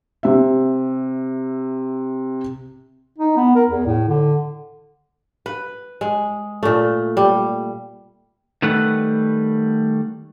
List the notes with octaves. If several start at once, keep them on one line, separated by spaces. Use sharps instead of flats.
C3 E5
D#4
B3
A#4
E2
A2
D3
B4
G#3
A#2 A3
G3
D#3 G3 A3 B4 F#5